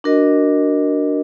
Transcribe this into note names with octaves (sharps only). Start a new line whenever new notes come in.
D4 F#4 A#4 D#5